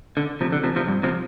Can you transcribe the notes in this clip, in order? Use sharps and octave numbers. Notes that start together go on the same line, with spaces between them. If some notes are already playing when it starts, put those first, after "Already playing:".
D3
C3 F3
D3
C3 F3
C3 F3
G2
C3 F3